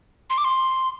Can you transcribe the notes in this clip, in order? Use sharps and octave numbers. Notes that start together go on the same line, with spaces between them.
C6
D6
C6